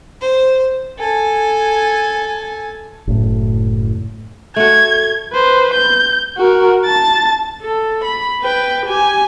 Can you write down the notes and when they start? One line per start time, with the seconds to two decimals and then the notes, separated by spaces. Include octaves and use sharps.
0.21 C5
0.99 A4 G#5
3.07 F#1 A2
4.56 A3 F#4 G#6
5.33 B4 C5
5.74 G6
6.38 F#4 A#4
6.85 A5 A6
7.62 A4
8.04 B5
8.41 B4 G5
8.86 G4 G#5